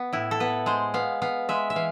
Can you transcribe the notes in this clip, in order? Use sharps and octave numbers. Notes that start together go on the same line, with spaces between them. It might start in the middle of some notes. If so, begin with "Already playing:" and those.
Already playing: B3
A2 E4
A4
B3 B4
G#3 C5
B3 F5
B3 F5
G#3 E5
E5
E3 F5